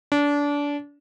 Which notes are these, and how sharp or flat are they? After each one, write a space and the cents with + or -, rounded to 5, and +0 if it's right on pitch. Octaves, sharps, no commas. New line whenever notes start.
D4 -25